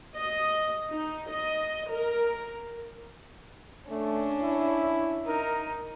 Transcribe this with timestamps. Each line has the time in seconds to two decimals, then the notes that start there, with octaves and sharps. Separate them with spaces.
0.17 D#5
0.91 D#4
1.30 D#5
1.90 A#4
3.90 A3 C#4 D4
4.41 E4
5.27 D#4 A#4